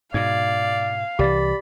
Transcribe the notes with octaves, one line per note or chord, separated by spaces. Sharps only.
G#2 B2 D5 F5 G#6
C2 E3 G4 D5 B5 A6